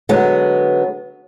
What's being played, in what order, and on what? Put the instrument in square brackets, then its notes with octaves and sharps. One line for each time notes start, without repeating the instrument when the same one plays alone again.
[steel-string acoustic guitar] D3 F#3 G#3 B3